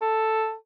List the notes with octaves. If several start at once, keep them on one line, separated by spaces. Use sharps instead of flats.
A4